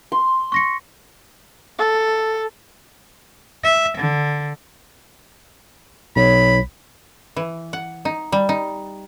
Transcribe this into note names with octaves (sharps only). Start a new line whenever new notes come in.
C6
C#6 A#6 C#7
A4
E5
D3
B1 C#5 B5
E3
F#5
D#4
G3
D#4